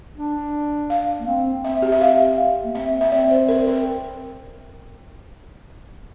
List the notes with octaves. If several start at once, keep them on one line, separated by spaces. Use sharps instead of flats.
D4
F5
A#3
C4
C4 E5
G4
E5
F5
A#3
C4 E5
E5
C4 D5
C5
A#4
A#4